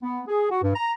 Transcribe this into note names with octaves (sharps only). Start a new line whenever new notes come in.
B3
G#4
F#4
G2
A#5